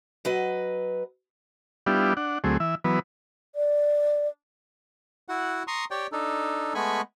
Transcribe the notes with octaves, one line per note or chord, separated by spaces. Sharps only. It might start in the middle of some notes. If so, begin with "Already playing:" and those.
F#3 B4 D#5
G3 B3 D4 E4 F4 G4
D4 F#5
D2 F#3 A3 C4 G#4
E3 E5
E3 F#3 B3 B4
D5
E4 F#4 F#5
A#5 C6 C#6 D#6
G4 C#5 D5 G5
D4 D#4 A4
G#3 A3 B3 G#5 B5 C#6